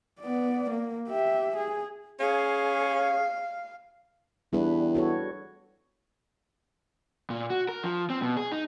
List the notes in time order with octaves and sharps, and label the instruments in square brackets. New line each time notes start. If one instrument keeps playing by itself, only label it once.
[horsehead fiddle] B3 D5
A#3
G4 E5
G#4
[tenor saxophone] C#4 [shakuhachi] G#4 [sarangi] F5
[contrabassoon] E2 [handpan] G3 D4 B4
[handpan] F#4 A4 C#5
[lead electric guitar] A#2
F#4
A#4
F3
C4
B2
G#4
D#4